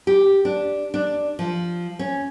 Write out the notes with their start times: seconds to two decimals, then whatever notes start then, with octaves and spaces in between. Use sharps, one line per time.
0.07 G4
0.45 D4
0.94 D4
1.39 F3
1.99 C#4